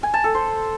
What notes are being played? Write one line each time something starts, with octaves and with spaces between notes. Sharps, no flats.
G#5
A5
A4
C5